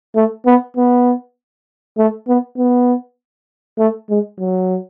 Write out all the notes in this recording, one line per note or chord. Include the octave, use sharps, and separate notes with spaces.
A3
B3
B3
A3
B3
B3
A3
G#3
F#3